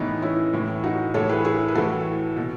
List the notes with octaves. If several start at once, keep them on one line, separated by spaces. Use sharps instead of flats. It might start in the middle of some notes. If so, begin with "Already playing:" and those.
Already playing: A2 E3 B3 D#4
C#4 E4
A2 E3
D#4 F#4
A2 E3 A4 C#5
G#4 B4
E4 G#4
B4
A2 E3 F#4 A4
B2